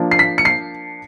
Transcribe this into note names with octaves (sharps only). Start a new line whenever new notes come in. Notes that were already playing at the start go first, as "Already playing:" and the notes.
Already playing: F3 A#3 D4 F4
C7
B6
C#7
C7